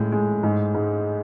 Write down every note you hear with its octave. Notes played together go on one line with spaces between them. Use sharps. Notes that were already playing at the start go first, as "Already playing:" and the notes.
Already playing: A2 G#3
G#3
G#2
G#2